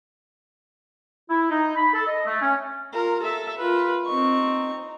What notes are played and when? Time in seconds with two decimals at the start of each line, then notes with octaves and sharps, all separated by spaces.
1.30 E4
1.50 D#4
1.76 B5
1.94 A4
2.07 D#5
2.26 A3
2.41 C#4
2.94 F4 A#4
3.23 A4 E5
3.59 F4 A#4 B4
4.06 C4 D#4 C#6